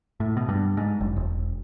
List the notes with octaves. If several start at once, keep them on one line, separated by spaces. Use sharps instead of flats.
A2
B2
G2
G#2
F#1
E1